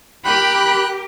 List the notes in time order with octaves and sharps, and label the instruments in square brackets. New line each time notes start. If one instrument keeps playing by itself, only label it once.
[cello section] G4 A#4 [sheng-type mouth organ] G5 F#6 [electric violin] B5